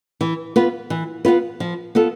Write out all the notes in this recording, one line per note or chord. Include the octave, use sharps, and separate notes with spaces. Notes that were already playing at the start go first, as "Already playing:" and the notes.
E3
B3 F4 B4
E3
B3 F4 B4
F3
B3 F4 A4